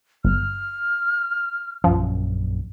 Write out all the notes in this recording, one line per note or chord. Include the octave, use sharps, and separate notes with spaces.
G1 F6
A#1 F#2 F3 C#4